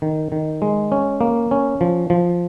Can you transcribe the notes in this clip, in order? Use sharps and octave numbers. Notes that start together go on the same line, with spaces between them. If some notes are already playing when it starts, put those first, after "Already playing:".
D#3
D#3
G#3
C#4
A#3
C#4
F3
F3